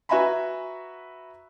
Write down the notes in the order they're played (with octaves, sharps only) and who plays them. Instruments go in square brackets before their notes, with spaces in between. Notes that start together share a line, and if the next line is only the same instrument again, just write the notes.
[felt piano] F#4 B4 E5 G#5 A#5 B5